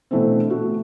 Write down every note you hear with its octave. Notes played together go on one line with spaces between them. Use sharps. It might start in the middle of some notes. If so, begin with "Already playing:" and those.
B2 D3 E3 A3 B3 C4
A3 F#4